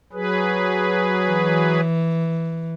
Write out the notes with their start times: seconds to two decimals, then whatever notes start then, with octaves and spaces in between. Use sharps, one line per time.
0.13 F#3 G#4 B4
1.30 E3